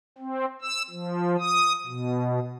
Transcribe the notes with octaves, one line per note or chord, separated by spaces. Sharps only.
C4
E6
F3
D#6
B2